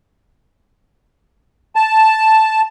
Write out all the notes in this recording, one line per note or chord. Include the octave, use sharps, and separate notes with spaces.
A5